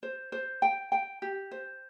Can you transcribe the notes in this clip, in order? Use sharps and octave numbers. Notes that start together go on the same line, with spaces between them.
C5
C5
G5
G5
G4
C5